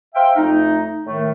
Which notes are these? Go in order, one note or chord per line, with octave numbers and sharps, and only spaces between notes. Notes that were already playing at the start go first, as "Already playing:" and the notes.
C5 E5 F5 G5
F2 A3 D#4
A2 D#3 A3